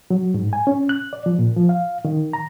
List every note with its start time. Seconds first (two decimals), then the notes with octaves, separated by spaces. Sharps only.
0.10 F#3
0.34 G#2
0.53 G#5
0.67 C#4
0.89 F#6
1.13 D5
1.26 F3
1.39 A#2
1.57 F3
1.69 F5
2.05 D#3
2.33 A#5